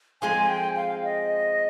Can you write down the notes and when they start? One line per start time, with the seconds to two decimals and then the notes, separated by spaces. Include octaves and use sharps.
0.22 F3 G#3 C4 G#5
0.44 G#5
0.49 G5
0.76 F5
1.04 D#5